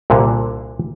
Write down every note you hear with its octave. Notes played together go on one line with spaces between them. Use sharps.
C2 A#2 D3